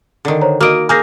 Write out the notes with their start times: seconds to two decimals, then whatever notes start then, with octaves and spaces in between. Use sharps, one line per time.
0.25 D3 D#3
0.42 C5 C#5 A#5
0.61 A#3 F#4 D#5 D7
0.89 A#3 G#4 G#5 G6 A#6